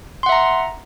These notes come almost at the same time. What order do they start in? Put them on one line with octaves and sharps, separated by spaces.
C6 F#5 E5 A#5